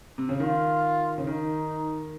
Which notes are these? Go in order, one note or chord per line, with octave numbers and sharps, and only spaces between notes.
C3
C#3
D#3 F4
C#3
D#3 D#4